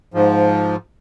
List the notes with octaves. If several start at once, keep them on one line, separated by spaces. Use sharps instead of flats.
G#2 F3